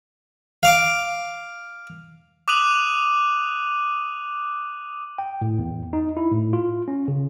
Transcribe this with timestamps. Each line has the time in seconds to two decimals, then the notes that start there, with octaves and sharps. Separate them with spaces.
0.63 F5 D6
2.48 D6 D#6 F#6 D#7 F7 F#7
5.18 G5
5.41 A2
5.59 E2
5.93 D#4
6.17 E4
6.32 A2
6.53 F4
6.88 C#4
7.08 C#3